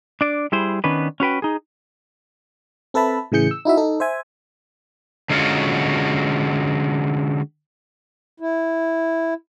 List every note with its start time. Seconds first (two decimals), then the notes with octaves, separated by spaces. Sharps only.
0.21 D4 D5
0.52 G3 E4 G#4 C5
0.84 D#3 B3 C#4 D4 B4
1.20 C#4 F#4 B4 G5
1.42 D#4 G#4
2.94 C4 A4 B4 E5 A5 B5
3.32 A2 C#3 E3 G#4 G6 C#7
3.51 E6
3.65 D#4 E4 F#4 E5
3.77 D#4 A4
4.00 C5 E5 G#5
5.30 D3 G#3 A3 C#4 F4 F#4
8.40 E4